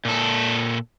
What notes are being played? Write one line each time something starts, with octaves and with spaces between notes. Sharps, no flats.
A#2 A4